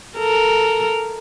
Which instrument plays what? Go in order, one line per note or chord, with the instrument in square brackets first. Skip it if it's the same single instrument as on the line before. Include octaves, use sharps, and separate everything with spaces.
[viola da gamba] A4 A#4